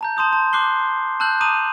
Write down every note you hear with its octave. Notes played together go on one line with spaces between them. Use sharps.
A5 A#5 G6
A5 C6 D#6 G6
A5
C6 D6 F#6 C7 G7
A5 E6 F#6 G6 F#7
A5 A#5 D6 D#6 D#7 F#7